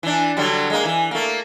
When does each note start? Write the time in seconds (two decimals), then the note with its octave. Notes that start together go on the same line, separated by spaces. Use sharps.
0.03 E3 D4
0.37 D3 F#3 G3
0.70 G#3 A#3
0.85 E3
1.11 A3 A#3